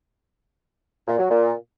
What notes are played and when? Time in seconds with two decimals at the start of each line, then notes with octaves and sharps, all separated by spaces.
1.07 A#2
1.19 F#3
1.30 A#2